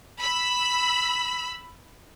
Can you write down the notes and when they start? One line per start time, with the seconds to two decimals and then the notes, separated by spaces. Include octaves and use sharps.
0.21 B5 E6